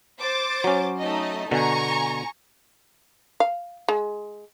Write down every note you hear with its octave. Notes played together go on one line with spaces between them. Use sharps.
C5 D6 A6
F#3 C#4
A3 D#4 D#5
B2 D3 G#5 A#5 C#6
F5
G#3